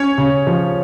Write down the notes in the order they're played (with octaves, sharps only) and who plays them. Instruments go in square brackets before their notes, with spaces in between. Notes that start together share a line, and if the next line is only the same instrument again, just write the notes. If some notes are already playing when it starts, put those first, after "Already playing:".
Already playing: [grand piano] C#4 [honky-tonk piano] C#5
[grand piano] C#3
F3